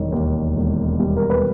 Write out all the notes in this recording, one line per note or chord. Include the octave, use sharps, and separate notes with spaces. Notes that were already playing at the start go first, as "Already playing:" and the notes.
Already playing: E1 D#3 G3 C#5
D#2
E1
G3
A#4
B4